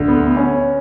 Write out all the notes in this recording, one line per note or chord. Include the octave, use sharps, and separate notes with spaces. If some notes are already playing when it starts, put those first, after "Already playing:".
Already playing: D2
B3
C#4